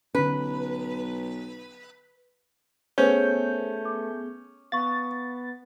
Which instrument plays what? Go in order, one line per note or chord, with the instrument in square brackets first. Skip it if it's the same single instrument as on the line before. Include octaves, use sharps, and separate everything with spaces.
[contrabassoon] B1 [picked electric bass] D3 C#4 [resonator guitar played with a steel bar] B4
[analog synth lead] A3 [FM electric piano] B3 G#4 G6 [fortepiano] C#4 [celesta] C5
[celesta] D6
[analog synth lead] B3 [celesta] F5 C#6 [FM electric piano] A6